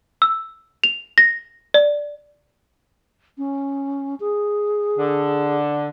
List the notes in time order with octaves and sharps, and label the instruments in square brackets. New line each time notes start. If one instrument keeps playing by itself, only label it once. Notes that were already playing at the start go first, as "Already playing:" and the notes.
[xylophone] E6
F7
A#6
D5
[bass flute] C#4
G#4
[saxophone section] D3